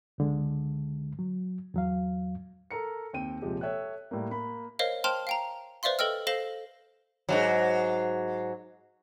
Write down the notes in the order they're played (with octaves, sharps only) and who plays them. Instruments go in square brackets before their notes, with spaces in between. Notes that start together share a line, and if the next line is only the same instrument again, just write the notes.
[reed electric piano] C#2 D3 G#3
F#3
E2 F#3 F5
[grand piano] A4 A#4 A#5 C#7
D#2 C4 G5 D#7
D#1 C3 F3 G#3 G4
A4 C#5 E5 G5 F#6
A2 G3 A#3
A#3 B5
[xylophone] A#4 C5 C#5 D#5 F5
C5 G5 A5 C6 F6 F7
F5 G5 A#5
B4 C5 D5 E5 F5 C6
A4 B4 D#5 G5 E6 F6
A4 C5 F5 A#6 E7 G7
[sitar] G#2 C3 F#3